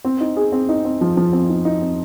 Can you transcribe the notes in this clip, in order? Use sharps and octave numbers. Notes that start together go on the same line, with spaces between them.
C4
D#4
G#4
C4
D#4
C4
F3
F3
C4
D#4
D#4
C4